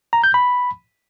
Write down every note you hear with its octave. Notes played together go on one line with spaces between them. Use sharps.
A#5
G6
B5